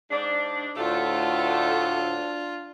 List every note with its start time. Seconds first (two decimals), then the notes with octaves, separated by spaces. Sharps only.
0.11 G#2 D4
0.77 D2 A2 A3 D4 F4 A4